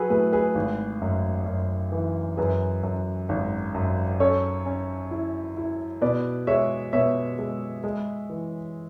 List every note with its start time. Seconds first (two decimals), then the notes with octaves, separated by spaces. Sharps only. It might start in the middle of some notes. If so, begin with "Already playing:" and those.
Already playing: F#3 F#4 G#4 A4 B4
0.10 A2 G#4 B4
0.33 G#4 B4
0.55 G#1
1.02 F#2
1.46 F#2
1.92 E3
2.37 F#2 G#4 B4
2.83 F#2
3.29 G#1
3.74 F#2
4.20 C#4 A4 C#5
4.66 C#4
5.11 E4
5.57 E4
6.01 B2 B4 D5
6.47 G#3 C#5 E5
6.93 B2 C#5 E5
7.39 G#3
7.84 G#3
8.30 E3